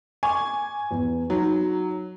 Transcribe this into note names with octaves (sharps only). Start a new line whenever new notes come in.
G#5 C#6 D6
E2
F#3 D#4